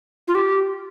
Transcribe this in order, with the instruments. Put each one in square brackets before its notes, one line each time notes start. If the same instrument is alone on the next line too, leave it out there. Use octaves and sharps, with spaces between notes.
[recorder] F4
G4